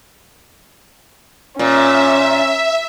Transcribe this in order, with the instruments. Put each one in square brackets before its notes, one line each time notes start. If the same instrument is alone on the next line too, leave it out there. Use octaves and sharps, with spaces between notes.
[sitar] A#2 [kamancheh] C#4 [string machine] E5